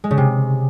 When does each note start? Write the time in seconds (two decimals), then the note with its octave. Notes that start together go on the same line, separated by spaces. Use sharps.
0.04 G#3
0.11 C#3
0.17 C3